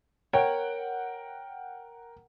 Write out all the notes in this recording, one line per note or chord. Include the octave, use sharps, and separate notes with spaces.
A#4 C#5 F#5 G5